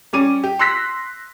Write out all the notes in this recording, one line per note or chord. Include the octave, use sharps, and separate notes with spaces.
G3 C#4 D6 D#7
G4
C6 E6 F#6 A#6 B6